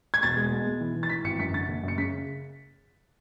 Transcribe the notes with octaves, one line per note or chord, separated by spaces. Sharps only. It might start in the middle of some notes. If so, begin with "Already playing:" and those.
G#6
E1 A6
G#3
B2
B2
E3
E3
A6
E3 B6
G#1 C#7
F#2 B6
D3 A6
F#1
F#2
C#7
C#3 B6